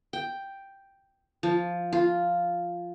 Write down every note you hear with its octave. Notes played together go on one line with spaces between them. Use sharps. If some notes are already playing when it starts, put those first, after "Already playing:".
G5
F3
F4